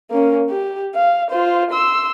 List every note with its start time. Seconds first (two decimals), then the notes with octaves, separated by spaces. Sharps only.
0.11 A#3 C#4
0.50 G4
0.95 F5
1.30 F4 C5
1.71 C6 E6